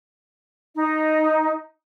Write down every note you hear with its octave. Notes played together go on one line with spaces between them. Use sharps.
D#4